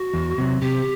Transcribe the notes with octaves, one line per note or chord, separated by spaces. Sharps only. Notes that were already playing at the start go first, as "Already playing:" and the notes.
Already playing: F#4
E2
C3 F#3
C3 G4